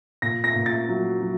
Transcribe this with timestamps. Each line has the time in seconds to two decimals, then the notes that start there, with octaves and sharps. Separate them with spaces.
0.22 A#2 A#6
0.44 A#6
0.55 A#2
0.66 A6
0.89 F#3
1.21 F#3